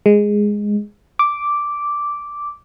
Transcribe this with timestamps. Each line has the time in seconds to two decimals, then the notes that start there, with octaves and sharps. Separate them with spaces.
0.06 G#3
1.19 D6